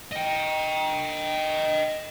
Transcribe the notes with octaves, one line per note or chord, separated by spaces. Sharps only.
D#5 G5